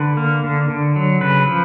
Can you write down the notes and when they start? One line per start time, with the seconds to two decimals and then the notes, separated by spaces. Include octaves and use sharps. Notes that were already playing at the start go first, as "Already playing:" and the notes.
Already playing: D3 B4
0.17 A#3
0.44 D3
0.70 D3
0.96 F#3
1.21 C#3 B4
1.47 F3